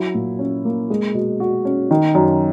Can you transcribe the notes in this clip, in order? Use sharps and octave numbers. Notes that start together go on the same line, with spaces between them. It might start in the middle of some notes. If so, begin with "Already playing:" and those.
Already playing: F#3 E4
A#2
C#4
A#3
G#3
B2
F#4
C#4
D#3
F#2